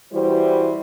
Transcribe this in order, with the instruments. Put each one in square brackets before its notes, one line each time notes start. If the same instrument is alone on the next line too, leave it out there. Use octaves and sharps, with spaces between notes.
[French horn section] E3 G3 E4 F#4 C5